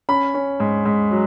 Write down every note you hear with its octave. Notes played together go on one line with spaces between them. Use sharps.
C#4 B5
C#4
G#2
G#2
F#3